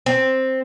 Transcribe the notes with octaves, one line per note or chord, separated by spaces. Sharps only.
C4